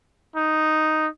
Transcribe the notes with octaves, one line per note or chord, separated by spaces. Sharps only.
D#4